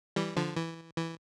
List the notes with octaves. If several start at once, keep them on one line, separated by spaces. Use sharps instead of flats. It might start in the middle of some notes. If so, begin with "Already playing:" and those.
E3 G3
D3 F3
E3
E3